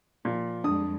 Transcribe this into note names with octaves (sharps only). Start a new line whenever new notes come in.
A#2 F3
F2 G3 G#3 D4 D#6